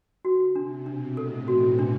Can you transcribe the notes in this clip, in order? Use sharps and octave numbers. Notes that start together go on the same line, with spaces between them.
D3 F#4
C3 D4
B2 D4
A2 A4
C3 E3 F#4
D4